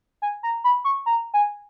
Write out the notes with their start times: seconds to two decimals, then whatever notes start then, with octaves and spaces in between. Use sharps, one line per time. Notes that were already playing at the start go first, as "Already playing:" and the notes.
0.22 G#5
0.43 A#5
0.64 B5
0.85 C#6
1.06 A#5
1.34 G#5